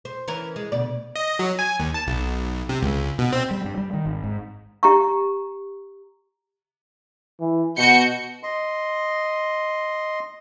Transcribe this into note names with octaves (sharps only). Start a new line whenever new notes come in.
C5
E3 C#4 A#4
G#3
D2 B2 D5
D#5
F#3
G#5
D#2
A5
B1
C3
C#2
B2
C4
G3
G2
G3
D#3
G#1
G#2
G4 A#5 C#6
E3
B2 F#4 G6 C#7
D#5 C6